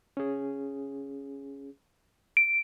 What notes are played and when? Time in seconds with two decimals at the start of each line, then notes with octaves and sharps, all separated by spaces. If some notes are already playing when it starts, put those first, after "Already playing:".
0.17 C#4 G#4
2.37 D7